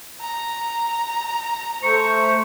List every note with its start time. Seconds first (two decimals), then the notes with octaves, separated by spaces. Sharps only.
0.21 A#5
1.83 A3 C5 C#6